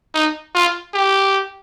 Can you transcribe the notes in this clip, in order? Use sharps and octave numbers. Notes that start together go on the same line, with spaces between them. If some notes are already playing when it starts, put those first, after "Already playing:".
D#4
F4
G4